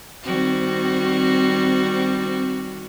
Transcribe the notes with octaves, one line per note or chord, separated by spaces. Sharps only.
D#3 G3 C4 F#4